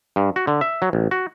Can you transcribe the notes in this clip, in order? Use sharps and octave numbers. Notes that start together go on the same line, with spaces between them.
G2
F#4
D3
E5
F#3
A1
F#4